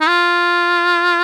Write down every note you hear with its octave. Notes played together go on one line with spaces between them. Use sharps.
D#4
F4